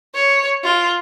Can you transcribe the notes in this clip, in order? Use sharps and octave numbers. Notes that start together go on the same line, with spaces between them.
C#5
F4